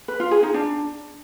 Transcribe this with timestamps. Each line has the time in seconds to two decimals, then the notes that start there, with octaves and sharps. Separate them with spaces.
0.08 B4
0.20 F4
0.31 G#4
0.43 D#4
0.54 D4